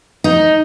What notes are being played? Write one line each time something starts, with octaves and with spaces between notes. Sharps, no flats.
D#4